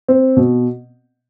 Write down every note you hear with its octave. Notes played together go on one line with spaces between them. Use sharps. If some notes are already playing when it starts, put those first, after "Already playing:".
C4
B2